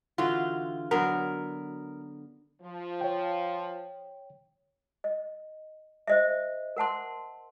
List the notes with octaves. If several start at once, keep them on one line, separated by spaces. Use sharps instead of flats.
D3 E3 F4 F#4
D3 F#3 B3 A#4
F3
C#5 G5
D#5
C5 D#5 E5
A#4 F#5 A5 C6